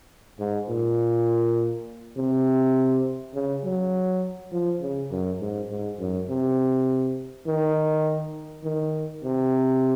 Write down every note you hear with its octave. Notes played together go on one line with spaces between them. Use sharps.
G#2
A#2
C3
C#3
F#3
F3
C#3
F#2
G#2
G#2
F#2
C3
D#3
D#3
C3